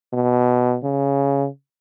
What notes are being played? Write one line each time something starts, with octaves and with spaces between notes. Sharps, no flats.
B2
C#3